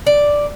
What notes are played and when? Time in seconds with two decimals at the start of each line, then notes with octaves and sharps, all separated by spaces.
0.07 D5